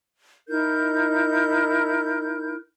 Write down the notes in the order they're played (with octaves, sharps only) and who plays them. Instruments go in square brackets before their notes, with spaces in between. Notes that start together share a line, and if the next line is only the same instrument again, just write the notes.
[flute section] D#4 E4 A#4 G6